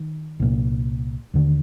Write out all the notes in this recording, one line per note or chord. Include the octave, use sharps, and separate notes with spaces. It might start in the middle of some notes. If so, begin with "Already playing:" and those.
Already playing: D#3
C2 A#2
D#2 D3